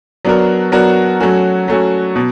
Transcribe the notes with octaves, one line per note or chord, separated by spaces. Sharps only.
F#3 B3 D4 F#4 A#4
F#3 B3 D4 F#4 A#4
F#3 A3 C#4 F#4
F#3 A3 C#4 F#4
B2